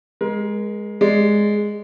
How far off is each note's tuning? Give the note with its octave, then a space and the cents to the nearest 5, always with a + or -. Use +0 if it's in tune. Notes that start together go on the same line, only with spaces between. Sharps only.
G#3 +0 A#4 +30
G#3 +0 D5 +0